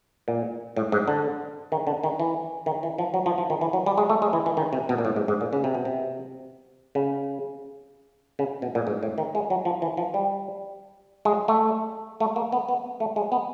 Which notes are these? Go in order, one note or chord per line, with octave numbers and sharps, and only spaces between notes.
A#2
A2
G#2
D3
D#3
D3
D#3
E3
D#3
E3
F3
F#3
F3
F3
D#3
E3
F#3
G3
G#3
A3
G#3
E3
E3
D#3
C3
B2
A#2
A2
G#2
G#2
A#2
C#3
C3
B2
C3
C#3
C#3
B2
A#2
G#2
A2
D#3
G#3
F#3
F3
E3
F3
G3
G#3
A3
A3
A#3
B3
B3
A3
G#3
B3